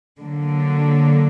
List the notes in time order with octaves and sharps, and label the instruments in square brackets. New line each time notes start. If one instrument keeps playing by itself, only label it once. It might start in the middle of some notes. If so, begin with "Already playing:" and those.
[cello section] D3 F#3 A#3